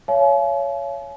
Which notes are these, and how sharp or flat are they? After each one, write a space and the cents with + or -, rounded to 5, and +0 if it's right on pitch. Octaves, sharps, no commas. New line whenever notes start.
C#5 +15 F5 -40 G#5 +45